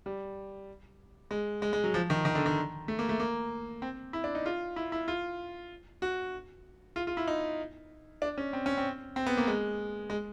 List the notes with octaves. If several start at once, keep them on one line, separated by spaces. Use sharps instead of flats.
G3
G#3
G#3
G#3
F#3
F3
D#3
D#3
D3
D#3
A3
A#3
A3
A#3
C4
E4
D4
D#4
F4
E4
E4
F4
F#4
F4
F4
E4
D#4
D4
C#4
C4
C#4
C4
C4
B3
A#3
G#3
G#3